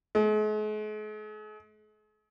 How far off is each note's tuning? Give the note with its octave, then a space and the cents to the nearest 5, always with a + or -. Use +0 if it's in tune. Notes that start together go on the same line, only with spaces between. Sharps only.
G#3 +45